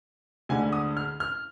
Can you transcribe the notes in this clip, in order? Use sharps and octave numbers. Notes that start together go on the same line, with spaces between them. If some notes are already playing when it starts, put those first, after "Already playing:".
D2 D3 G#3 G#5
D#6
F6
F6